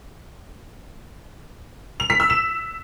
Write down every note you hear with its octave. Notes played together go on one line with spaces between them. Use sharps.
F7
B6
E6
E7